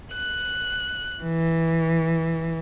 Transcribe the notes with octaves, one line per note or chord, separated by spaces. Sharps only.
F#6
E3